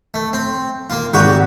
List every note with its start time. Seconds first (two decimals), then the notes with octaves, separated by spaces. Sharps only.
0.14 A3
0.33 C4
0.90 A#3 F4
1.13 G#1 G#2 F#4 G4 F#5 C#6